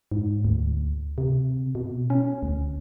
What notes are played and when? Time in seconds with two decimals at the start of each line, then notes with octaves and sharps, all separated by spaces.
0.12 G#2
0.45 D2
1.18 C3
1.75 B2
2.10 C#4
2.43 D2